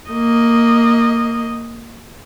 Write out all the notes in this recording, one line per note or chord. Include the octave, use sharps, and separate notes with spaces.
A#3 D#5